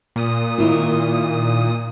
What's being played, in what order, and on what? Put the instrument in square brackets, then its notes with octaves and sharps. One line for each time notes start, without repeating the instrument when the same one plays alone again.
[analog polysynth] A#2 D#6
[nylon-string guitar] D#3 E4 F4